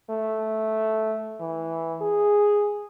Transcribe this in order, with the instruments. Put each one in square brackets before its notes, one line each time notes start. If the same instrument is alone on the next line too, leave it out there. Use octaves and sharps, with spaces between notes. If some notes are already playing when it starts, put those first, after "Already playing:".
[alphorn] A3
E3
G#4